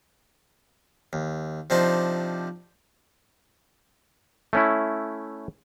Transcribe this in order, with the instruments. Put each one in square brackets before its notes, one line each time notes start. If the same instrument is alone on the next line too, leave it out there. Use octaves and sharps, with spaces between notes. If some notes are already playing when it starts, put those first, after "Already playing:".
[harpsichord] D#2
C3 F3 D4 D#4 C5
[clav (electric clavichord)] A3 C#4 E4